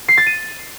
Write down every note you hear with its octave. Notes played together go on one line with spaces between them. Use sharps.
C7
A6
D#7